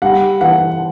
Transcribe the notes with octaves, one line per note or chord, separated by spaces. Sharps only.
G3 F#5
E3 F#5